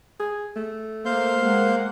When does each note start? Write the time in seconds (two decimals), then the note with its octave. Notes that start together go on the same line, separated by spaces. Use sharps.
0.20 G#4
0.56 A3
1.05 A#3 C5 F5 G6
1.40 G#3 A#3 F#5